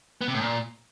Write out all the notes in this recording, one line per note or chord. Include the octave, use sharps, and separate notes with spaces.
B3
C3
A2
A#2